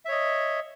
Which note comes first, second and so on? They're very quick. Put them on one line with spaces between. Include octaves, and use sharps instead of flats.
E5 C#5 D#5